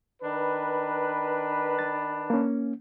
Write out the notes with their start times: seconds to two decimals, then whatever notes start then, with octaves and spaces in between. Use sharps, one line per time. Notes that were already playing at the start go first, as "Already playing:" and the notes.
0.22 D#3 D4 B4
1.79 A6
2.30 A#3 C#4